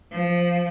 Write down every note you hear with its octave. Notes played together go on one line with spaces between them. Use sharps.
F3